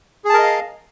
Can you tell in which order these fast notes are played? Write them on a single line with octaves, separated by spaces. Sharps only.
G#4 A5 A#4 D#5 F5